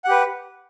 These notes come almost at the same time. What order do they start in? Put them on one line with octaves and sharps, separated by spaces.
F#5 G4 B4